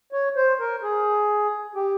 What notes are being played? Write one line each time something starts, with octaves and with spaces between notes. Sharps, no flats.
C#5
C5
A#4
G#4
G4